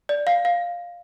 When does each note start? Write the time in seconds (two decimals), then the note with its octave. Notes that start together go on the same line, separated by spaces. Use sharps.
0.09 D5
0.27 F5
0.45 F5